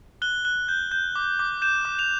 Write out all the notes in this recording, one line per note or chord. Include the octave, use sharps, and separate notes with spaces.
F#6 G7
F#6
G6
G6
D6
D6
G6 E7
D6
F7